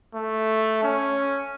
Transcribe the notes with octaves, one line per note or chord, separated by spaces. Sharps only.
A3
C#4